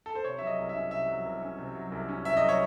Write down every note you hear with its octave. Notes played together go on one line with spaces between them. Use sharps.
A4
C5
C3 C#5
F#3 E5
D#5
C2
E5
C#4
C3 E5
F#3
C2
C#4
C3
F#3
C2
C#4
C3 E5
F#3 D#5
C#5